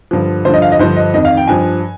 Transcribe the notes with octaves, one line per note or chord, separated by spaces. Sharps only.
G2 D3 F3
G2 D3 F3 C5
D#5
F5
D#5
G2 D3 F3 C5
D#5
F2 D#3 D#5
F5
G5
G2 F3 G#5